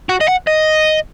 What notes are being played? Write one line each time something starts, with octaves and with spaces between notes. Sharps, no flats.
F#4
D#5
F#5
D#5